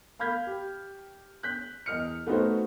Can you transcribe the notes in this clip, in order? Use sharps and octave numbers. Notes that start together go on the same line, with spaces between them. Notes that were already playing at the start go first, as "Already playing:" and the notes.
F5 B5 F6 G6 G#6 B6
G4
F#6 G6 B6
E2 D#5 F6 C#7
A3 B3 C4 D#4 F#4 C5